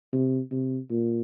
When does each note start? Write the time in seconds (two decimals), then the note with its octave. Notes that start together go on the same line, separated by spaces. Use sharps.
0.13 C3
0.51 C3
0.90 A#2